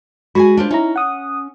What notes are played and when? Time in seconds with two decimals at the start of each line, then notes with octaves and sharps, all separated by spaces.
0.35 G#3 F#4 G#4 G#5 B5
0.57 D4 F4 C5
0.71 C#4 D#4 E4 A#5
0.96 F#5 D#6